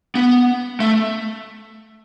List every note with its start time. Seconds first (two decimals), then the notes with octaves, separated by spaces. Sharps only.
0.15 B3
0.80 A3